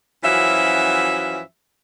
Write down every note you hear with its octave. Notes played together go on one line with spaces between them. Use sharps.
F#2 E3 F3 C#4 F#4 E5